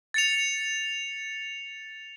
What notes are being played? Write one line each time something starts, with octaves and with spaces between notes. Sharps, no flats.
A6 C#7 F7